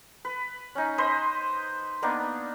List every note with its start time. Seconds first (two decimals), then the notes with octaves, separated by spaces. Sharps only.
0.25 B4
0.75 C#4 D#4
0.98 B4 C5 D#5 C6
2.02 A#3 B3 D4 D#4